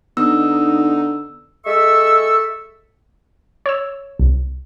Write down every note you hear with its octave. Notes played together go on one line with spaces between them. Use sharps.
D3 B3 D#4 E6
G#3 A4 E5 C#6 E6
C#5 E6
C2